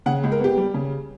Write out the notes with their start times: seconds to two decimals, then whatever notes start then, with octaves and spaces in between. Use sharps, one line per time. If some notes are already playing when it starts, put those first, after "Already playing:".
0.06 C#3 F#5
0.23 C#2
0.32 A#4
0.40 B3 G4
0.57 G3
0.74 C#3